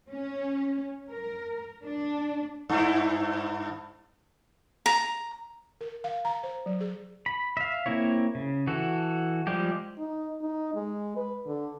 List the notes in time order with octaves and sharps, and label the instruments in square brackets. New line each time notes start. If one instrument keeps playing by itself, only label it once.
[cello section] C#4
A#4
D4
[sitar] G2 E4
[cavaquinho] A#5
[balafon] A#4
F5
A#5
C5
F#3
G#4
[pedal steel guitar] B5
E5 F5
A#3 C4 E4 C#5
C#3
E3 F#4 A4
F3 G3 G#3 G4
[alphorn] D#4
D#4
G#3
B4
D3